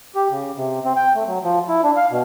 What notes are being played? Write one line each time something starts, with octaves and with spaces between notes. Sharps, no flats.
G4
C#3
C3
C4
G5
A3
F#3
F3
E4
D4
F5
B2